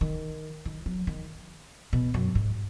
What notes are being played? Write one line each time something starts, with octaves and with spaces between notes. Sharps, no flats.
D#3
D#3
F#3
D#3
B2
F#2
G#2